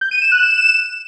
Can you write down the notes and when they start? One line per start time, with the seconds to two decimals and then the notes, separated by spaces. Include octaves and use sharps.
0.01 G6
0.11 D#7
0.21 E7
0.31 F#6
0.41 E7